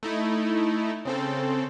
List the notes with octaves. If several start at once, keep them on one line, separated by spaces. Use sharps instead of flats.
A3 D#4 E4
C#3 C4 A4